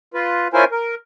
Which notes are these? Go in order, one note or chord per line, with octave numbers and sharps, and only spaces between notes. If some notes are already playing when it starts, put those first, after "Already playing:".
F4 B4
C#4 E4 F4 A#4 C5 G#5
A#4